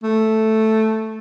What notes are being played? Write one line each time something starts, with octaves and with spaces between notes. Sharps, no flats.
A3